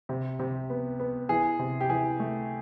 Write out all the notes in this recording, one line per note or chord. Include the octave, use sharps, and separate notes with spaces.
C3
C3
B3
B3
E3 G#4
C3
G4
E3 G#4
A3